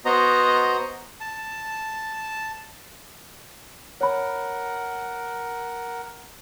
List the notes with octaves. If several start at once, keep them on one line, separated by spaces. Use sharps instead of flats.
B3 F#4 C5 D#5 A#5
A5
A#4 C#5 F#5 B5